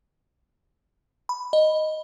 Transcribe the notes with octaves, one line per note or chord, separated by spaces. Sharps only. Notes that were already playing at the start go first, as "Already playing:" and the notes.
B5
D#5